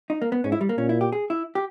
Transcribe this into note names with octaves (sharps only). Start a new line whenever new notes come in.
D#4
A#3
B3
G#2 C#4
E4
G3
A#3
A#2 C#4
E4
G4
G#4
E4
G4